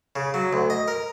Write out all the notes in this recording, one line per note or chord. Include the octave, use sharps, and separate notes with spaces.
C#3
F#3
D2
D#5
A#4